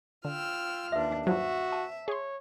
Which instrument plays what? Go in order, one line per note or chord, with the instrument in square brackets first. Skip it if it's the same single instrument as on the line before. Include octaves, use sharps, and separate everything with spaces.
[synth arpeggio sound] D3 [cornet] F4 [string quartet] G5 E6 F6
[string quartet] D#2 D4 [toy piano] B4 E5
[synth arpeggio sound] G2 F3 F#3 [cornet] F#4 [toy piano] C5 [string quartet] E5
[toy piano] A5
[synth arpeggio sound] G#4 C6 [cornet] C#5